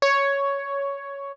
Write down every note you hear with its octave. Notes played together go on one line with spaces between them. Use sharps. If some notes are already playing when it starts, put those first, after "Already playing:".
C#5